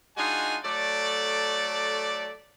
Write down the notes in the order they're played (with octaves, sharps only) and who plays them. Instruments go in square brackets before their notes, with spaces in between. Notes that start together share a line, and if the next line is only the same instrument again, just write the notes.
[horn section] G#3 D4 D#4 F4 F#4 G#5
F#3 A3 A4 D5